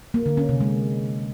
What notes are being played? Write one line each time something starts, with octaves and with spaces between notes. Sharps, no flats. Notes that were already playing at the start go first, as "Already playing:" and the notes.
A#3
D3
C#4
C3
G#3